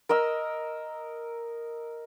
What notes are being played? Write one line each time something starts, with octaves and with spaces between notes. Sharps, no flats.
A#4 D#5 E6